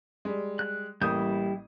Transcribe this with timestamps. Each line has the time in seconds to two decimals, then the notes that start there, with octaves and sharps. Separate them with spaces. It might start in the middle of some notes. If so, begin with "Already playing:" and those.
0.25 G3 G#3
0.59 F#6
1.01 A1 G3 A#3 E4 D#6 G6